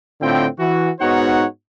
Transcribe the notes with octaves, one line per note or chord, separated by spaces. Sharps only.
A2 D3 C4 F4 G5
E3 F#4
G#2 B3 D#4 F#4 C#5 F#5